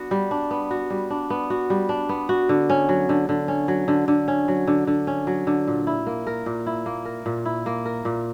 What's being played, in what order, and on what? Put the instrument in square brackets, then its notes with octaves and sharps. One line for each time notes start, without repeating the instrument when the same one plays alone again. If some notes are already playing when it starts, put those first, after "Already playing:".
Already playing: [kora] B3 D4 F#4
G3
D4
B3
F#4
G3
D4
B3
F#4
G3
D4
B3
F#4
D3
C#4
F#3
D3
D3
C#4
F#3
D3
D3
C#4
F#3
D3
D3
C#4
F#3
D3
A#2
E4
A#3
A#4
A#2
E4
A#3
A#4
A#2
E4
A#3
A#4
A#2